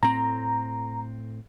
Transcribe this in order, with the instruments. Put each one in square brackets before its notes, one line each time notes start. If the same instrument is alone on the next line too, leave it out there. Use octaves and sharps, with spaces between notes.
[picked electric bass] A2 C4 [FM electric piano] A#5